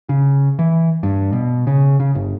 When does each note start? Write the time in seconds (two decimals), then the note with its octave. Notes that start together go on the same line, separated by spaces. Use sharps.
0.09 C#3
0.59 E3
1.03 G2
1.33 B2
1.67 C#3
2.00 C#3
2.15 G1